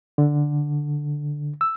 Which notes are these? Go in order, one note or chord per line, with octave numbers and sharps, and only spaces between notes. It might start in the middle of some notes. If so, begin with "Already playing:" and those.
D3
E6